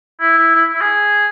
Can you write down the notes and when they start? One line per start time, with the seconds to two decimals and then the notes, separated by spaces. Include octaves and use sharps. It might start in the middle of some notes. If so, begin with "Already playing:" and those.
0.20 E4
0.37 E4
0.55 E4
0.72 E4
0.81 G#4